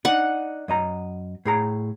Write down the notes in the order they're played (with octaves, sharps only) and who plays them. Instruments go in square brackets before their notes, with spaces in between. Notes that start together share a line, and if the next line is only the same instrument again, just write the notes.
[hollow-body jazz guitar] D4 D#4 [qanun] F#5
[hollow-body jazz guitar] F#2 D#5 A#5
A2 G#4 A#5